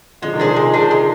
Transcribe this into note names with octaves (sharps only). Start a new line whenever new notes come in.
D3 F3 G#3
C3 D#3
D4 G#4 C5
C3 G#3
D4 G#4 C5
G#3